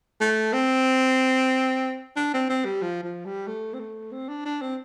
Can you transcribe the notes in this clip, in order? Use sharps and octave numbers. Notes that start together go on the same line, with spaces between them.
A3
C4
D4
C4
C4
G3
F3
F3
G3
A3
C4
A3
C4
D4
D4
C4